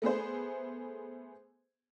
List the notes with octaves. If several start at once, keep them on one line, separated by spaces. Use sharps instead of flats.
A3 B3 G#4 C5